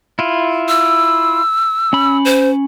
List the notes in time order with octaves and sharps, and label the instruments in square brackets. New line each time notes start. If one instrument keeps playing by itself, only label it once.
[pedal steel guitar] E4 F4
[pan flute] E6
[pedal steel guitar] C#4 B5
[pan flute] C5